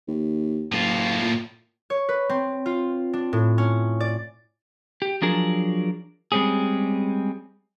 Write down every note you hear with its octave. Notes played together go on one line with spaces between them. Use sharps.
D#2
F#1 A2 F4
A#2
C#5
B4
C4
F4
D4
A2
C#4
D5
G4
F3 F#3 D4 G#4 A#4
G3 G#3 C4 C#4 G#4